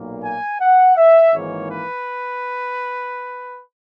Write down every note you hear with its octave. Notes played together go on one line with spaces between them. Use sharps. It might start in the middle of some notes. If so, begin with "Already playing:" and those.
Already playing: B1 A#2 A#3
G#5
F#5
E5
G#1 G#2 E3 A#3 C#5
B4